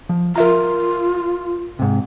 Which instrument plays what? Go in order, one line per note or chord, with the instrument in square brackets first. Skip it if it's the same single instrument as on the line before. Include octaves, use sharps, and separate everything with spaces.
[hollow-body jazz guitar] F3
[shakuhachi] F4 [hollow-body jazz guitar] A#4 E5 A#5
[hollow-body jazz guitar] G#2 C3